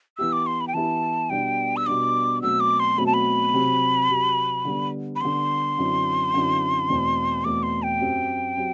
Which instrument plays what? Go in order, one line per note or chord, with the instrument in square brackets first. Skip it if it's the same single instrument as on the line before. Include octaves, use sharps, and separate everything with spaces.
[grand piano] E3 B3 E4 G4 [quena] E6
[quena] D6
C6
B5
G5
[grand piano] E3 B3 E4 G4 [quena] A5
[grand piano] B2 G3 B3 D4 [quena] G5
[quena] E6
[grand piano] B2 G3 B3 D4 [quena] D6
[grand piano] B2 F#3 A3 C4 [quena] E6
[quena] D6
C6
[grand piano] B2 F#3 A3 C4 [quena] B5
[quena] A5
B5
[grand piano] C3 F#3 C4 G4
C3 F#3 C4 G4
D3 G3 B3
[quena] B5
[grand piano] D3 G3 B3 [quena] C6
[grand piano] F#2 D3 F#3 C4 E4
F#2 D3 F#3 C4 E4
E2 B2 A3 C4
[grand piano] E2 B2 A3 C4 [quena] D6
[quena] C6
G5
[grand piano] F#2 F#3 C4 G4
F#3 C4 G4